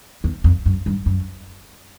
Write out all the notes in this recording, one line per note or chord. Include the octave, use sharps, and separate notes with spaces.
E2
F2
F#2
G2
F#2